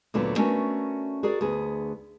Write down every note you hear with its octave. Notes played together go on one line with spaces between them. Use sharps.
D2 A#2 D3 F#3 A#3 B3
A3 B3 C#4 D4 F#4 A#4
F#4 G#4 A#4 D5
D2 B3 G#4